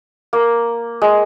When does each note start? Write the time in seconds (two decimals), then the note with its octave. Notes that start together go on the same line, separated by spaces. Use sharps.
0.33 A#3
1.02 G#3